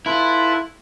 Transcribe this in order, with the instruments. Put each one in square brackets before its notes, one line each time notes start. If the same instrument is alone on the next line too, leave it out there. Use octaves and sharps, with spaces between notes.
[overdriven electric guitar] E4 [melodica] F4 A4 B4